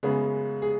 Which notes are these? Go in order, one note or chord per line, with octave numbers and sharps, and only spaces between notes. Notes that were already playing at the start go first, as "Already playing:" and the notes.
F#2 C#3 G#3 B3 G#4
G#4